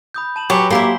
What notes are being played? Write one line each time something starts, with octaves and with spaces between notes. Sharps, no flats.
B5 D#6 G6
A5 E7 F#7
F#3 G4 B4 G#5 B5 C#6
A#3 E4 G4 C6 B6 G7